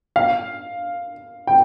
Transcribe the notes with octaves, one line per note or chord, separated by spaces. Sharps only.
F5
G5